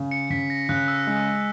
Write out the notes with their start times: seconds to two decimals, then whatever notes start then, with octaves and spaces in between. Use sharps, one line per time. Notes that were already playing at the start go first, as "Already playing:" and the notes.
Already playing: C#3
0.11 C#7
0.30 C#3 B6
0.50 A#6
0.69 C#3 F#6
0.88 E6
1.07 G#3